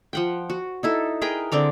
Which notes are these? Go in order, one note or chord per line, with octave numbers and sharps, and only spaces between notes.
F3 F#5 G5
F#4
D#4 E4 A4
G#4 A#4 B4 G5
D3 C4 D5 A#5